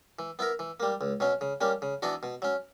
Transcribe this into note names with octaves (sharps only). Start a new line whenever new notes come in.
E3
B3 E4 A#4
E3
G3 A#3
C#2
B2 F#3 C#4
C#3
G3 A#3 C#4
C#3
E3 B3 D4 F#4
B2
F#3 C#4